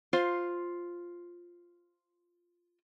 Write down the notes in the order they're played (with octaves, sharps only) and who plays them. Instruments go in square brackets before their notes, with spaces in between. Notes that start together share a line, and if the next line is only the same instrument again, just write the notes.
[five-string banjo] F4 C5